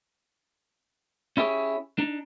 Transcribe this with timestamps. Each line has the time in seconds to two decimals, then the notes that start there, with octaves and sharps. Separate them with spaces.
1.37 C#4 E4 G4 G#4 C#5
1.98 D4 D#4